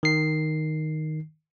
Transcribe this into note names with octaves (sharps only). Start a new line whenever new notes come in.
D#3 C7